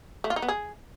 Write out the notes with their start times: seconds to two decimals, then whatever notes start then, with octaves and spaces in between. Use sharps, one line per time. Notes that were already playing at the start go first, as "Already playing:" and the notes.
0.24 A3
0.30 F4
0.36 D#4
0.42 B3
0.48 G#4